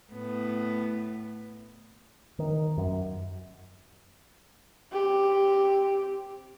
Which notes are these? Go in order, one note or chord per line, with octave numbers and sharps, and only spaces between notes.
A2 B3
D#3
F#2
C4 G4